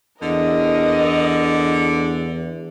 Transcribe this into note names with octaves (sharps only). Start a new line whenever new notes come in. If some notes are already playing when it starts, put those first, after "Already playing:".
E2 D3 A#4 D#5